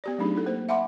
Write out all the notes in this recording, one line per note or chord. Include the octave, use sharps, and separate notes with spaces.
B3 G4 D5
F#3 A3 C4 D4 D#4 G#4
D#4 E4 A4
A#3 C5
E5 F#5 G#5 B5 C6 D6